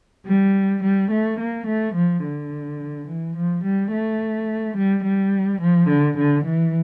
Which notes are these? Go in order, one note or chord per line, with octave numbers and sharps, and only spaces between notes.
G3
G3
A3
A#3
A3
F3
D3
E3
F3
G3
A3
G3
G3
F3
D3
D3
E3